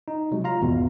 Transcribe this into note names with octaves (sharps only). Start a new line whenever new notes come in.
D#4
C3 F#3 G#3
F4 F5 A#5
G#1 E2 B2